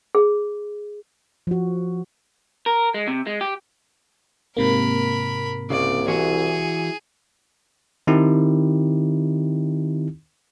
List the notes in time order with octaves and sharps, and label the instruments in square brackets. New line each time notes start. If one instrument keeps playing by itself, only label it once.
[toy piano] G#4
[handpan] F3 F#4
[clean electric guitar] A#4
G#3
C3
G#3
G4
[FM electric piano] G#2 C3 A#3 [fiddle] A#4 B5
[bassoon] C2 [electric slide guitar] C#3 [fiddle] D5
[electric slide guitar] E3 F#4 [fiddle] G#4
[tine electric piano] D#3 C4 D#4 E4 G4